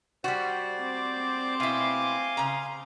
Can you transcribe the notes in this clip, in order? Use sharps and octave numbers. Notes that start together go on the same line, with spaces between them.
G3 F#4 C5 D5
C4 D6
B2 E4 F5 G#5 C6
C#3 A#5